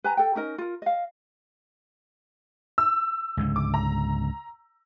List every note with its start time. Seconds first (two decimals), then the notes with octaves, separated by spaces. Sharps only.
0.04 B4 G#5 A#5
0.17 A4 G5
0.35 C#4 D#4 A#4 D#5
0.58 F4 A#4
0.82 D#5 F5
2.78 E6
3.37 C#2 G#2 D3
3.56 D6
3.74 A#5